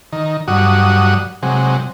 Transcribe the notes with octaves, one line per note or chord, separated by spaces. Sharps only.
D#3
G2 F#3 F#4 D#6
C3 F#3 G#3